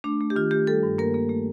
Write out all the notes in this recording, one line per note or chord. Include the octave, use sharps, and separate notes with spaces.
A3 D4
A3
G4
D#3 F4
A3 G4
G3 A4
G2
A#3 A#4
A#3
A3